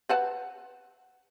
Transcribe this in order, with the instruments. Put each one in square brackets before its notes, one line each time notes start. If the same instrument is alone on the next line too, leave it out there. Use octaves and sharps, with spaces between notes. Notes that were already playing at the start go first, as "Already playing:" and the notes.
[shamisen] B4 F#5 A5